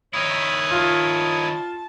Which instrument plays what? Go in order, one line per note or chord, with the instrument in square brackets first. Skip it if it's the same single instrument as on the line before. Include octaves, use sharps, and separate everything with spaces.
[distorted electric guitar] D#3 E4 [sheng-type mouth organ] C#5 D#6
[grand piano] F4 [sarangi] A5